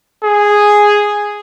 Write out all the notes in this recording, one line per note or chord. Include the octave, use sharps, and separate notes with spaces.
G#4